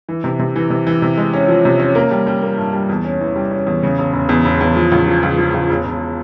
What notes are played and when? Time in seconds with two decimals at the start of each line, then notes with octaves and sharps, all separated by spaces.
0.09 E3
0.24 C3
0.39 C3
0.56 E3
0.70 C3
0.87 E3
1.02 C3
1.17 G#3
1.33 C#4
1.48 F3
1.65 C3
1.80 C#4
1.95 A#3
2.11 G3
2.27 G3
2.42 A#3
2.58 G2
2.73 G3
2.89 E2
3.05 C#4
3.21 E3
3.36 G3
3.51 C#4
3.67 E2
3.83 C#3
3.98 E1
4.13 E1
4.29 E2
4.45 E1
4.61 E2
4.76 F3
4.92 C#2
5.07 F3
5.23 C#2
5.38 F3
5.54 C#2
5.70 E1
5.85 E1